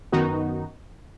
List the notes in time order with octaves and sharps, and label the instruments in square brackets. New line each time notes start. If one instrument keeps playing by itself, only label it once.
[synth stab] F#2 D#3 B3 D#4 F#4